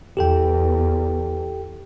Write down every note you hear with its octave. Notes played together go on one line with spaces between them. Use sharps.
E2 G4 A4 G5